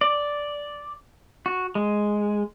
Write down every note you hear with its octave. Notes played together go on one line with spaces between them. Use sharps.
D5
F#4
G#3